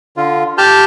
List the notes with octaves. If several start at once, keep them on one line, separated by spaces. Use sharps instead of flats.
D3 F4
G4 A5 F6 G6